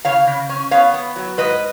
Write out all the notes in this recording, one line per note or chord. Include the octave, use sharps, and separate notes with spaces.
C#3 C#5 F5
C#3
C#4
B3 C#5 F5
B3
F#3
G#2 B4 D#5